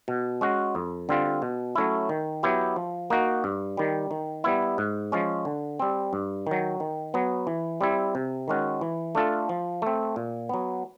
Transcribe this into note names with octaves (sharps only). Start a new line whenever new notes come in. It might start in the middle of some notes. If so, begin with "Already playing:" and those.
B2
G#3 C#4 F#4
F2
D3 G3 C4 F4
B2
F#3 A3 C#4 E4
D#3
F#3 B3 E4 G4
F3
A#3 D#4 F#4
G2
D#3 G3
D#3
G3 B3 E4
G#2
F3 G#3 C#4
D3
G3 C4
G2
D#3 F#3
D#3
F#3 B3
E3
G3 C4 E4
C3
D#3 G#3 C#4 F#4
E3
A3 D4 F4 A4
F3
A3 C4
A#2
F#3 B3